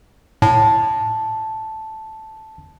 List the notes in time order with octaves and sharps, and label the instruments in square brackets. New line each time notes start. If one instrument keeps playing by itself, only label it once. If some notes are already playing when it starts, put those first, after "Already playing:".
[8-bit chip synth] A2 [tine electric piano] A5